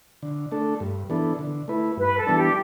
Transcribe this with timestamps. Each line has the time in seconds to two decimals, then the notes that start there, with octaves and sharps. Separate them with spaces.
0.23 D3
0.52 A3 D4 A4
0.80 G2
1.10 E3 B3 D4 A4
1.39 D3
1.68 A3 E4 B4
1.97 G2 B4
2.16 A4
2.27 E3 G3 B3 D4
2.36 G4